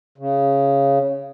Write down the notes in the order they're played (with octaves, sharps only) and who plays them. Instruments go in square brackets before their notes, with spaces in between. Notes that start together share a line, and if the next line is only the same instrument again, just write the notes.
[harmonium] C#3